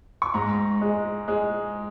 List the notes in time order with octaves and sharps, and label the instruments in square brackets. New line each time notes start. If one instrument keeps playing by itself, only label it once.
[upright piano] C#6
G#2 A#5
G#3
G#3